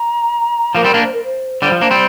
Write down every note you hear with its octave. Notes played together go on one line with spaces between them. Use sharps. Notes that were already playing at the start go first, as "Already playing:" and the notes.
Already playing: A#5
F3 A#3 A#4
G3 C4
A#3 D4
C5
A#4
C5
D3 G3 C5 D5
F3
A#3 D4
G3 C4